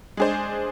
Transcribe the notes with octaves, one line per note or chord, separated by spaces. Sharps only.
G#3 D4 G#4 C5